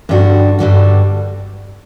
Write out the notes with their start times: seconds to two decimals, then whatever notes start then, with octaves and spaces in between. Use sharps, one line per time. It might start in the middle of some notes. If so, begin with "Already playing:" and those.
0.09 G2 D3 G3 D4 F#4
0.59 G2 D3 G3 D4 F#4